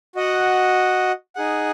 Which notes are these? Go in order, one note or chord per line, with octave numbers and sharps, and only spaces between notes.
F#4 D#5 F#5
D#4 G#4 F#5